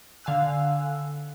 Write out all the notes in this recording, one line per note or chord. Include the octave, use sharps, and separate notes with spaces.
D3 F5 G#5 E6 F#6